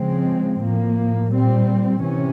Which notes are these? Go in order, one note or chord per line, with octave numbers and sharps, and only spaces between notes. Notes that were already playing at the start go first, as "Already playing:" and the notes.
Already playing: C#3 F3 G#3 C4
A2 F3 A#3
A#2 G3 C4
C3 E3 C#4